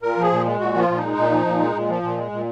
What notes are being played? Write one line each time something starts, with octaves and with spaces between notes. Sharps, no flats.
A#2 A#4
F3
G#4
A#2
G#3
A#2 F#4
F3 F4
A#2
D#4
G#3
A#2
F3
A#2
G#3
A#2
F3
A#2
G#3
A#2